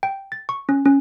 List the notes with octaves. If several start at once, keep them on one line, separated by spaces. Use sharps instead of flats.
G5
A6
C#6
C#4
C#4